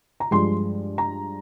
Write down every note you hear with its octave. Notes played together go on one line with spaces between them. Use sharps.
A#5
G2 F3 G#3 C6
A#5